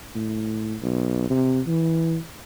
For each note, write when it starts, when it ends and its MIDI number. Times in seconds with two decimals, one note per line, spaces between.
0.15 0.76 45
0.83 1.29 35
1.30 1.60 48
1.67 2.18 52